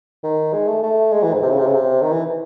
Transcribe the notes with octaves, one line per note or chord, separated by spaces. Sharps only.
D#3
G#3
A3
A3
G#3
E3
G#2
C3
C#3
C3
C#3
C3
D#3
E3